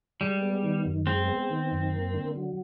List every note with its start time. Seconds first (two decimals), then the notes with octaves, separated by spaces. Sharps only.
0.20 G3 G#3
0.42 B3
0.63 D#3
0.85 F#2
1.07 G#3 C4
1.28 B3
1.50 D#3
1.71 F#2
1.93 A#3
2.13 D3
2.35 F#3